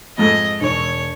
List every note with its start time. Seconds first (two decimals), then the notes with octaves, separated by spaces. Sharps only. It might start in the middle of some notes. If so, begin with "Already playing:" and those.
0.18 F2 G#2 A4 D#5
0.61 E1 C#5 C#6